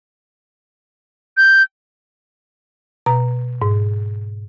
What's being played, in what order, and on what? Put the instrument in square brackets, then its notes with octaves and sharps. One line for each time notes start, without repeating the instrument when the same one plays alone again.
[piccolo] G6
[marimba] B2 A#5
G#2